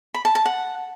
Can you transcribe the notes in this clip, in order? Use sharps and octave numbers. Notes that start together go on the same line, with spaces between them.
B5
A5
A5
F#5